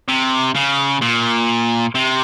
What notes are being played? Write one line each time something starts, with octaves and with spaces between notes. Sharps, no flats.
C3
C#3
A#2
C3